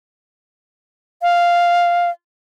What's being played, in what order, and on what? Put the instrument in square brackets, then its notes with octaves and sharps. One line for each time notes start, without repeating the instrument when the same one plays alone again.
[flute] F5